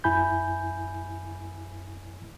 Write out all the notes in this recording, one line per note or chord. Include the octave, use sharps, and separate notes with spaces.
F#2 E4 G#5 B5 G6